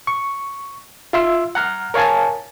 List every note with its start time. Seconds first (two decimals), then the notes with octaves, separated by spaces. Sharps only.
0.07 C#6
1.13 F4 E5 C6 E6
1.55 F#5 A#5 F6
1.94 A#4 C#5 F5 G#5 A5